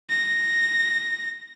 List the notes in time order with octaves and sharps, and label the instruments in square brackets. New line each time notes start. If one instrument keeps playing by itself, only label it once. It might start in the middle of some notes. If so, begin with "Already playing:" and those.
[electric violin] A#6